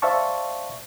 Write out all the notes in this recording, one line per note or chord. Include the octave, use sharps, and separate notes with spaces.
C5 D5 E5 F5 A5 C#6